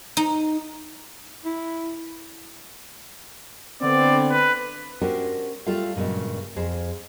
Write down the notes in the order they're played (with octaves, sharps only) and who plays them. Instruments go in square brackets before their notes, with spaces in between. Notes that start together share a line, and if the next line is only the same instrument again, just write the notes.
[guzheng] D#4
[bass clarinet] E4
[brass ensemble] D3 B3 C4 [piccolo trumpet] D5
[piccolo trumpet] B4
[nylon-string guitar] C#4 D4 F#4 G4 A#4 C5
G3 A3 F4 A4 F5
G2 A#2 C#3 F#3 G#3
F2 G#4 C5